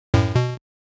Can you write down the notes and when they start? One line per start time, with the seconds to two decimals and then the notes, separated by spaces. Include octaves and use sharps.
0.14 F#2 A2
0.35 B2